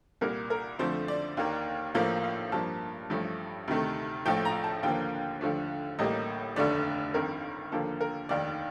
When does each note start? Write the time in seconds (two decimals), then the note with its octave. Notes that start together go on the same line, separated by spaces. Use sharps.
0.21 C2 A#2 G3 A#3 A#4
0.50 A#4
0.79 F2 D3 F3 A3 C5
1.08 D5
1.37 D#2 D#3 A#3
1.95 A#1 A2 F3 A#3 F5
2.24 F5
2.52 G2 F3 A#3 A5
3.10 A1 G2 F3 A3
3.68 D2 C3 D#3 A3
4.25 A#1 A2 F3 A3 G5
4.45 A#5
4.64 A5
4.83 D#2 D3 F3 A#3 G5
5.41 D#2 D3 F3 A3
5.99 A1 A2 G3 A#3 D#5
6.56 F1 D#2 D3 A3 D5
7.14 G1 F2 D#3 A#4
7.72 D#2 D3 F3 A#3 A4
8.01 A#4
8.29 F1 D#2 D#3 D5